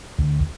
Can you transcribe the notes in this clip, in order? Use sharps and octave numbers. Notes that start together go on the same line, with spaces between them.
D2